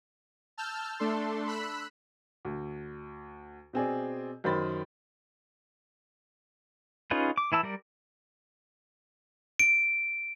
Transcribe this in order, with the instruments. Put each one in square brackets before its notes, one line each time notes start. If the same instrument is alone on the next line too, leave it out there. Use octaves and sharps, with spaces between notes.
[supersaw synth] A5 E6 F6 G6
A3 D4 A4 C6
B5 E6 F#6 B6
[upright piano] D2
B2 C4 G#4 D5
F#2 D#3 C5 B5 A6
[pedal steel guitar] C#4 D#4 F4 G#4 B4
D6
E3 E4 A5 E6
G3 A#4 D5
[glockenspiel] D7